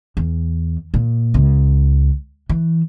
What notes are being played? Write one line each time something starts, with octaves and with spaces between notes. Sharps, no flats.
E2
A#2
C#2
E3